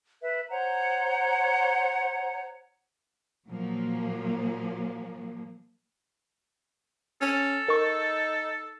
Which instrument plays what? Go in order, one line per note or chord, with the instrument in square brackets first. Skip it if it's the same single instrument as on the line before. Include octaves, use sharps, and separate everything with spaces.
[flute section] B4 E5
C5 C#5 F#5 A#5
[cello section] A#2 F3 F#3 A#3
[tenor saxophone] C#4 [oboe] A4
[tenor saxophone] D#4 [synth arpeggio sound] A#4 C#6